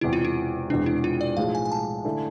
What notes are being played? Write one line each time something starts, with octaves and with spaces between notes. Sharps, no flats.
E1 E2 C3 E4
F4
E4
E1 E2 C3 D4
E4
F4
D5
B1 A2 F3 G#3 F5
G#5
G#5
A5
D3 A3 E4